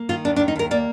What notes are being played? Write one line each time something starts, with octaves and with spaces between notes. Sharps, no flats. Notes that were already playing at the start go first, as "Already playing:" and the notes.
Already playing: A#3
D#3 F4
D#2 D4
D4
D#3
D#4
D#2 A#4
A#3 D5